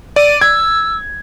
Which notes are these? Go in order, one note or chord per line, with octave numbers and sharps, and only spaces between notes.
D5 D#7
E6 G#6